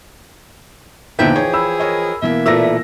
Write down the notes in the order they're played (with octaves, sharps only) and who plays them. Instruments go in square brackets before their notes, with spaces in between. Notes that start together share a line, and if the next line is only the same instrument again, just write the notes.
[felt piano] E2 A#2 D3 [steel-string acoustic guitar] E3 F3 G5 [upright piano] D#4 [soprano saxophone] E5
[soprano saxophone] G#4 [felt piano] C#5
[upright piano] B5 E6
[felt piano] A#4 C#5 D#5
[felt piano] B2 E3 A#3 [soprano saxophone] E5
[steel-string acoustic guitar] A#2 A3 B4 [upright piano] E6 A#6